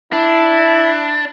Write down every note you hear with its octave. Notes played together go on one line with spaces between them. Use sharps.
D4 E4